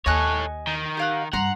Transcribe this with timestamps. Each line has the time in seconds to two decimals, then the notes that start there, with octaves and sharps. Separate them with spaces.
0.06 D#2 A4 C#5 D#5 G#5 F#6
0.67 D#3
0.97 G4 F5 F#5
1.33 G2 F#5 A#5 C6